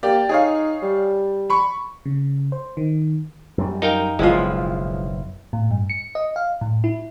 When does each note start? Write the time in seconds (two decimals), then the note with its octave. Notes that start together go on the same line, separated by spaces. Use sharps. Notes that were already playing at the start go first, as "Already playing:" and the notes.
0.03 A#3 G4 D5
0.29 D#4 G#4 C#5 F5
0.82 G3
1.50 B5 C#6
2.05 C#3
2.52 C5
2.77 D#3
3.58 F#2 G3
3.82 D#4 A#4 F5 G5
4.19 F#1 B1 B2 F3 G#3 E4 F4
5.53 A2
5.71 G2
5.90 C#7
6.15 D#5
6.36 F5
6.61 A2
6.84 E4